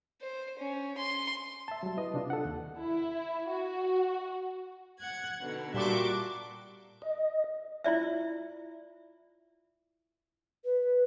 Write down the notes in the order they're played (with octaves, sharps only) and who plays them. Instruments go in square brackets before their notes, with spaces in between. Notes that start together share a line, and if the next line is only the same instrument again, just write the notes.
[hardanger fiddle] C5
C#4
C6
[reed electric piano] E5 A5
F#3 G3
E4 B4 D#5
C3 D4 F4
A4 F#5
D#2
[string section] E4
F#4
[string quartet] F#5 G#6
B2 D3 D#4
[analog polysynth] A#2 F#4 D6 [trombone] G3 [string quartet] E5 A5 C6
[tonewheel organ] D#5
[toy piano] E4 F4 D5 E5
[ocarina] B4